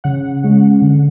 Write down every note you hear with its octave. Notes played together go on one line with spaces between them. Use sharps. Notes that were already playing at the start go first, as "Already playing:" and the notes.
C#3 F#5
G#3 C#4
D3